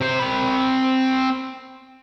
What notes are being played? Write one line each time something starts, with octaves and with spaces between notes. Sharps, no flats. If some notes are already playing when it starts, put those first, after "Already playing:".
C3 C5
C4 B5